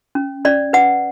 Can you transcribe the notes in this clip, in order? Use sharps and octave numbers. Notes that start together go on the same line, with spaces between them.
C#4
C#4 D5
B4 F#5